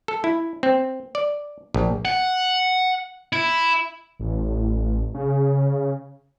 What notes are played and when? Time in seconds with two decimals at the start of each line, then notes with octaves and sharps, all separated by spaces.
0.08 A4
0.24 E4
0.63 C4
1.15 D5
1.74 A#1
2.05 F#5
3.33 E4
4.19 A1
5.14 C#3